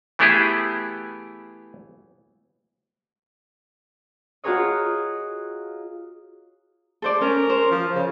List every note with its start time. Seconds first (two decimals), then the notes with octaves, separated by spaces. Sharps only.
0.19 E3 A3 B3 E4 G4 G#4
4.44 F4 F#4 G#4 A#4 C#5 D#5
7.02 A4 C5 D5
7.21 C#4 A#4
7.50 C5
7.71 F3
7.95 C#3